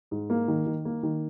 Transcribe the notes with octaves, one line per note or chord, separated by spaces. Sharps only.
G#2
A#3
D#3
D#3
A#3
D#3